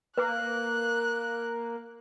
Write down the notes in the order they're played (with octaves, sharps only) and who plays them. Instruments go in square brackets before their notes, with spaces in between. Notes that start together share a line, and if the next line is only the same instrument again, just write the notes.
[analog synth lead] A#3 [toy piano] B4 [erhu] F#6